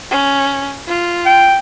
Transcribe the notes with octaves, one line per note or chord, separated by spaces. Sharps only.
C#4
F4
G5